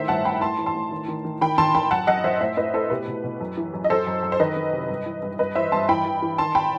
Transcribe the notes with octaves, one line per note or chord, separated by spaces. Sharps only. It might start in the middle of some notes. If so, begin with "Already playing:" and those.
Already playing: A2 D#3 C5 E5
G2 F#5 A5
G2 G5 B5
A2 A5 C6
E3
A5 C6
A2
D#3
D#3
D#3
D#3 G5 B5
D#3 A5 C6
D#3 G5 B5
F#2 F#5 A5
F#2 D#5 F#5
F#2 C5 E5
A2 C5 E5
A2 B4 D#5
A2 A4 C5
B2 G4 B4
B2
B2
F#2
E3
F#2
D#5
F#2 A4 C5
F#2
F#2
C5
D#3 B4 D#5
D#3
C3
G2
E3
G2
G2 B4 D#5
E3 C5 E5
G2 A5 C6
E3 G5 B5
E3
E3
D#3 A5 C6
G5 B5